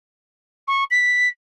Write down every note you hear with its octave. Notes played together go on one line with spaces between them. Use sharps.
C#6
B6